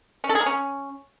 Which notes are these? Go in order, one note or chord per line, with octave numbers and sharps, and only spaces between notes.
C#4
A4
G#4
A#3
C#4